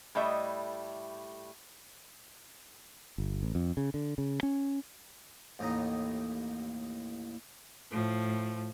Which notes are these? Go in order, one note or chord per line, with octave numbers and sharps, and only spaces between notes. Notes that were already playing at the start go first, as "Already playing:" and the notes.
A2 G3 A3 D#5 E5
G1
A1
F2
C#3
D3
C#3
C#4
A1 D#2 A2 D#5 A#5
A2 F3